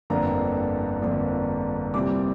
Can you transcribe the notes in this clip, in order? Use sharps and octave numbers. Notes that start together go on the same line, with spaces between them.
G1 F2 D3 A#3 D4 A#5
G1 F2 D3 A#3 D4
C2 A#2 G3 C4 D6